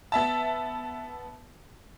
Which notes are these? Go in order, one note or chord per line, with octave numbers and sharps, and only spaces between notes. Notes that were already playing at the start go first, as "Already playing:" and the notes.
B3 E5 A5